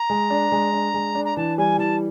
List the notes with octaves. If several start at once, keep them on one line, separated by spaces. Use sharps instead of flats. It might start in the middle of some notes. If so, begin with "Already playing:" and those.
Already playing: A#5
G#3
D4
G#3
D4
G#3
D4
A#5
E3 A5
G3 G#5
E3 A5